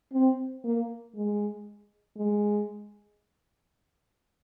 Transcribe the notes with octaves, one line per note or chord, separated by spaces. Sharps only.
C4
A#3
G#3
G#3